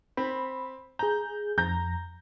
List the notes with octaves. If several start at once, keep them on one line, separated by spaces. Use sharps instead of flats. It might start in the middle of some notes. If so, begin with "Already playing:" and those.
C4 B5
G#4 A#5 G6
F2 A#5 G6 A#6